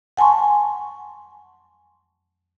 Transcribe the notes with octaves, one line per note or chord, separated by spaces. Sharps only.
F#5 G#5 A5 C6 C#6